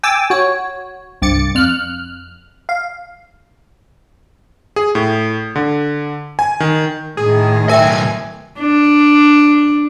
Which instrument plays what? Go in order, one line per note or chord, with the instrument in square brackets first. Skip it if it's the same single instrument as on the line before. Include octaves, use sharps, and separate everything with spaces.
[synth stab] G5 G#5 D6 E6 A6
F#4 C#5
C2 G2 D6 A6 C#7
F2 F6 F#6
F5
[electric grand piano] G#4
A2
D3
G#5
D#3
[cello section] A2 D#3 [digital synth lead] G#4
[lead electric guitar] B1 G#5 [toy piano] A#4 E5 G5 [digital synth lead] G#6
[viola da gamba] D4